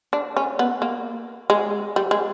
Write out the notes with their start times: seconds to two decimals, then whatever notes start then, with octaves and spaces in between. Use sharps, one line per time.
0.13 D4
0.37 C#4
0.59 B3
0.82 A#3
1.50 G#3
1.96 G3
2.11 G#3